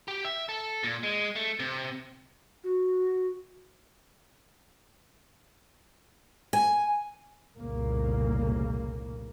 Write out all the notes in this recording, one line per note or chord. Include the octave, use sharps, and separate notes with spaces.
G4
E5
A4
A#2
G#3
A3
C3
F#4
G#5
F1 C2 A#2 C#3 A#3